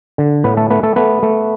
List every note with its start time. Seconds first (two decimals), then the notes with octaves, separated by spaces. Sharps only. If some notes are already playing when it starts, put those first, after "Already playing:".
0.18 D3
0.44 A2 B3 B4
0.57 A3 A4
0.70 A3 B3 B4
0.83 A3 A4
0.96 A3 B3 B4
1.23 A3